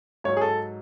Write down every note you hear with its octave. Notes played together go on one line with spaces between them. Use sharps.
G#2 F#3 C#5
G#4
A4